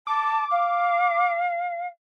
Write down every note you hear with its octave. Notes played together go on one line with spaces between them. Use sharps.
A5 D6
F5